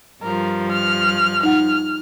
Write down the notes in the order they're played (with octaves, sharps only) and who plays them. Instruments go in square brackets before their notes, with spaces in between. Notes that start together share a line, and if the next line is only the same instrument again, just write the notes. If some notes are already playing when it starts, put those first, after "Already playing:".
[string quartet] G2 F3 [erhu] A#4
[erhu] F6
[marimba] D#4 F#5 [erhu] F6